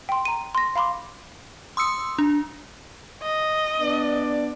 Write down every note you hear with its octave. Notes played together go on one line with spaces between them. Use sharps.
G5 C6
A#5 D#7
C6 A#6
F5 B5 C6 D6
C6 D#6 E6 C#7
D4
D#5
B3 D4 D5